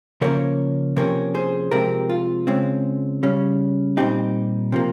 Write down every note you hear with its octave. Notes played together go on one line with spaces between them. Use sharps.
C#3 F3 A#3 C#4 A#4 C#5
C3 F3 A#3 C#4 A#4 C#5
G#4 C5
C3 F3 G#3 C4 G4 A#4
F4
C#3 G#3 C4
C#3 G3 C#4
A#2 G3 C4 D#4 G4
C3 F3 A#3